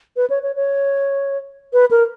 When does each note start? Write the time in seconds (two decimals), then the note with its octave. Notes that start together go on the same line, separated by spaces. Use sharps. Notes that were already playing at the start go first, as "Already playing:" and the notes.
0.17 B4
0.30 C#5
0.43 C#5
0.56 C#5
1.73 B4
1.91 A#4